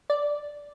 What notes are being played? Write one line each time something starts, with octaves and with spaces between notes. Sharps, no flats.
D5